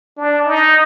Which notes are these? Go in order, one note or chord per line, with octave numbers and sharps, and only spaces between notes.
D4
D#4